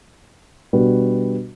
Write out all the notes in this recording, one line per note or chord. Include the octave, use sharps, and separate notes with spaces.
B2 G3 D4 F#4 B4